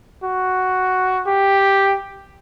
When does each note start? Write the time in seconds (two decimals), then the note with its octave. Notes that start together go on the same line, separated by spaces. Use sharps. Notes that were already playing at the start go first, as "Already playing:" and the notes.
0.24 F#4
1.26 G4